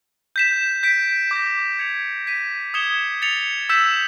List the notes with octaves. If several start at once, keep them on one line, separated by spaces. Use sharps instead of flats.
G6 B6 E7
G6 B6 D7
D6 G6 A#6
G#6 C#7 F7
G#6 B6 D#7
D#6 G#6 C#7 E7 G7
A6 C#7 F7
E6 G6 B6 E7